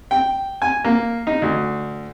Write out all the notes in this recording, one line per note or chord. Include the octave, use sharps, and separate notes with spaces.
G5
G#5
A#3
D#4
D2